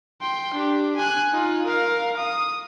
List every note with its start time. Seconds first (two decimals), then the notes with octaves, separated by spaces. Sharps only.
0.21 G5 C6
0.54 D4 G4
0.97 G#5 F#6
1.32 D#4 F4
1.66 A#4 F5
2.17 D#6